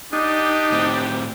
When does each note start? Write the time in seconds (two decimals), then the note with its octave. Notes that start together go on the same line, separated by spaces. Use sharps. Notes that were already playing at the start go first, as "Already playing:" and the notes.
0.13 D4 D#4 G4
0.72 A2 C4